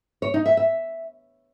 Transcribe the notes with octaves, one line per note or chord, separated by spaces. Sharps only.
C#5
D#4
E5
E5